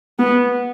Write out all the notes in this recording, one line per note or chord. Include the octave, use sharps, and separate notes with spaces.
B3